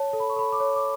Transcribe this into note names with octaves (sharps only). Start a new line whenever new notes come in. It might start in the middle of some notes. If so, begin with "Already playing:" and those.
Already playing: C#5 A5
A4
B5
C#6
A4 B5
D6
C#5
D6